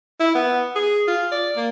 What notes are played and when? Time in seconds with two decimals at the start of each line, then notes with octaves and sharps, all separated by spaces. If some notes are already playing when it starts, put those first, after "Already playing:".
0.20 E4
0.35 B3
0.75 G#4
1.08 F4
1.31 D5
1.57 A#3